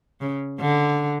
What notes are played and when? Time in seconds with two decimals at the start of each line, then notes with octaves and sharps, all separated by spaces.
0.21 C#3
0.60 D3